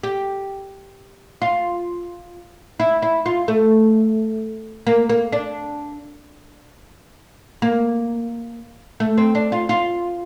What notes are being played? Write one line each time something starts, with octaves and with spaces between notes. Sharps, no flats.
G4
F4
E4
E4
F4
A3
A#3
A#3
D4
A#3
A3
C4
D4
F4
F4